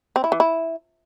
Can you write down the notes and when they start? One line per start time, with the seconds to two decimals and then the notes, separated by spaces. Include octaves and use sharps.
0.16 C4
0.24 E4
0.32 E3
0.40 E4